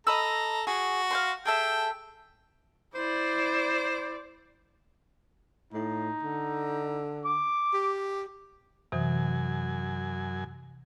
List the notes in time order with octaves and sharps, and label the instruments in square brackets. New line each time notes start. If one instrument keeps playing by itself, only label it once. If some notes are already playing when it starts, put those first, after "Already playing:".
[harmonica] A4 A#5 [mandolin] D#5 B5 E6
[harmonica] F#4 [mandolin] G#4
[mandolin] F5 G5 C6
[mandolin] G#4 A4 E5 [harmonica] G5
[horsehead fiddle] E4 D5 [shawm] C5
[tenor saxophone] A2 [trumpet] D#4
[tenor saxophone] D3
[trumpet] D6
[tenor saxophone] G4
[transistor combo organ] F#2 G#5 [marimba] C3 E3